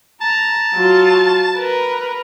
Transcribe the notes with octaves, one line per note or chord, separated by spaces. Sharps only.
A5 A#5
F#3 F4
A#4 B4